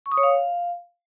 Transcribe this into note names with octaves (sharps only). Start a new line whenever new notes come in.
C#6
D#6
C#5
F5